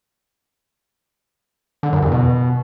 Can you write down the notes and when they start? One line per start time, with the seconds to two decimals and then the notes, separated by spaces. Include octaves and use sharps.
1.83 D3
1.93 F#2
2.02 E2
2.12 B2